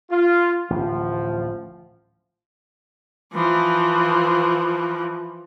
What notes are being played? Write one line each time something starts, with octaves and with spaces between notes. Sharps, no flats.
F4
D1 A1 F3
E3 F3